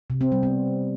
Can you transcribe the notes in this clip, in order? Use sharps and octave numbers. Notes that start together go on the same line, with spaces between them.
C3
C4
G3
B3